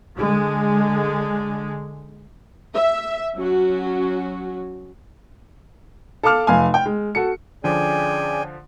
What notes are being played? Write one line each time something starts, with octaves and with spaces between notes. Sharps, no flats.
D3 G#3
E5
F#3 C#4 F#4
A4 F5 A5 D6 F6
F1 F5 G#5
G5
G#3
F#4 A4 C#7
D3 F3 C#4 G#4 D5 G5 G#5